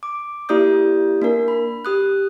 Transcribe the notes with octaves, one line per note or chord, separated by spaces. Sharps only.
D6
A#3 E4 G4 D5 D#6 G6
A#3 D4 A#4
B5
G4 D#6 F#6